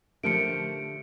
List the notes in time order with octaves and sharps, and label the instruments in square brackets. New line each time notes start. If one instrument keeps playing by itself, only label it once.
[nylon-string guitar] D3 G4 E5 [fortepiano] F3 A3 A#3 [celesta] C#7 D7